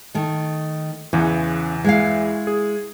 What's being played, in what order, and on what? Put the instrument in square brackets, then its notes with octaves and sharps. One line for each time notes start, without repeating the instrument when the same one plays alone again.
[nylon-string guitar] D#3 A3
[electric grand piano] E2 E3 [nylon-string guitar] C#3
[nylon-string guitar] G#3 E4 F5
[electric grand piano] G#4